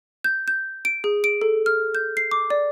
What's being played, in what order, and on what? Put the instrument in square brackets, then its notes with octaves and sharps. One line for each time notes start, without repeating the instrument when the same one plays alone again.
[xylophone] G6
G6
D7
G#4
D7
A4
F6
G6
C7
D6
D5